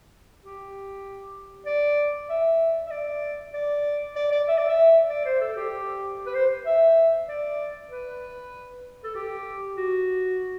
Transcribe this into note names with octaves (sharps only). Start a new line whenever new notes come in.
G4
D5
E5
E5
D5
D5
D5
D5
E5
D5
E5
D5
C5
A4
G4
B4
C5
E5
D5
B4
A4
G4
F#4